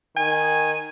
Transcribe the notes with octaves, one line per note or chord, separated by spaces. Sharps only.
D#3 G#5